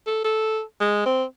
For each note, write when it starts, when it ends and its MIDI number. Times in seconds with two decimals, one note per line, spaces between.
0.06 0.21 69
0.24 0.62 69
0.80 1.03 56
1.06 1.24 60